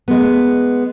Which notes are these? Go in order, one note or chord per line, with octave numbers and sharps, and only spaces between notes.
G#3 B3